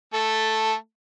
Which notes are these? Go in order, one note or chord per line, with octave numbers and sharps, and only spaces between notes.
A3 A4